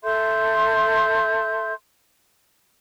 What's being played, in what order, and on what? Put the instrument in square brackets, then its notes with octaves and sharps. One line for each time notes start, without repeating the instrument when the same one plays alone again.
[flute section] A4 E5 C6 G6